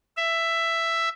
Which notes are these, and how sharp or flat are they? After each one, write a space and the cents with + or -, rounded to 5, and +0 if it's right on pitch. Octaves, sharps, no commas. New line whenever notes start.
E5 +10